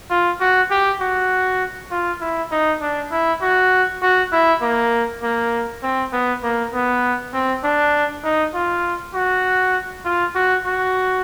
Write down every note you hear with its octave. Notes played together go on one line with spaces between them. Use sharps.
F4
F#4
G4
F#4
F4
E4
D#4
D4
E4
F#4
F#4
E4
A#3
A#3
C4
B3
A#3
B3
C4
D4
D#4
F4
F#4
F4
F#4
F#4